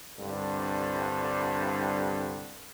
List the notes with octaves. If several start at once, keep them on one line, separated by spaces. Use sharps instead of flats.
C2 G2 D3